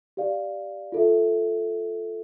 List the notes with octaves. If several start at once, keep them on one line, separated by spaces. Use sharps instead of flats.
G4 D5 F5
F4 A4 E5